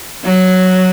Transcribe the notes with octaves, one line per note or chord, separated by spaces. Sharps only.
F#3